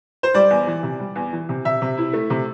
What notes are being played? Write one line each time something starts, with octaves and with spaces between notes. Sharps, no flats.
C5
G3 D5
E2
E3
C3
G3
E2
E3
C3
C3 E5
C3
E4
A3
C3